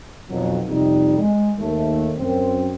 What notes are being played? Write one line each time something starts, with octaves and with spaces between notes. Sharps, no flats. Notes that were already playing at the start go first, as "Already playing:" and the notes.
B1 F2 F#3
F2 C3 G3 D#4
G#3
D#2 A3
F#2 C4